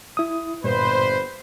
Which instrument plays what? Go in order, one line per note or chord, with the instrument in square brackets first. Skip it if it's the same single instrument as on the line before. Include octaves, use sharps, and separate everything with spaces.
[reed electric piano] E4 D#6
[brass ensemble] G1 B4 C5 [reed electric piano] G2 A#2